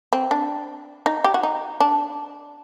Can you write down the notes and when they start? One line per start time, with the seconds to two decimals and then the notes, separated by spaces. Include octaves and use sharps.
0.13 C4
0.31 D4
1.06 D#4
1.24 G4
1.34 F#4
1.43 D#4
1.80 D4